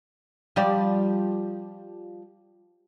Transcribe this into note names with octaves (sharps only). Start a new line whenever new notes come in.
F3 G3 D5